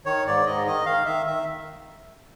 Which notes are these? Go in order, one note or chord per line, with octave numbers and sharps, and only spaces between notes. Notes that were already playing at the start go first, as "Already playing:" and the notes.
D#3 C#5
G#2 D5
G#2 D#5
D#3 D#5
D#3 F5
D#3 E5
D#3 E5